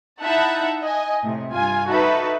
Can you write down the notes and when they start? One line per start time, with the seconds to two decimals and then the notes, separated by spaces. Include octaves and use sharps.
0.22 D#4 E4 E5 F#5 A5
0.81 D#5 G#5
1.23 A2 C3
1.52 G2 F4 G#5
1.88 D#4 F#4 A4 B4 E5